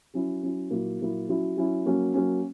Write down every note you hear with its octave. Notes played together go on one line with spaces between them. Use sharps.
F#3 C#4 E4
F#3 C#4 E4
A#2 F#3 A#3 E4
A#2 F#3 A#3 E4
F#3 C#4 E4
F#3 C#4 E4
F#3 A#3 C#4
F#3 A#3 C#4